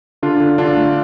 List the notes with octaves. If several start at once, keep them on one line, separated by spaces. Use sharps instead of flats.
D3 D4 F4
D3
D3 D4 F4
A3